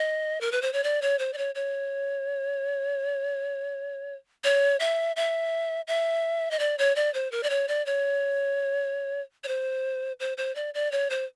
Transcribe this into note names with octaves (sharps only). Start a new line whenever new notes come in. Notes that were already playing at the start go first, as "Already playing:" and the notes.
Already playing: D#5
A#4
B4
C5
C#5
D5
C#5
C5
D5
C#5
C#5
C#5
E5
E5
E5
D#5
D5
C#5
D5
C5
A#4
D5
C#5
D5
C#5
C#5
C5
C5
C5
D5
D5
C#5
C5